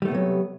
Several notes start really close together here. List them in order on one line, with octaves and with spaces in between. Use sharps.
G3 A3 B3 C3 F#3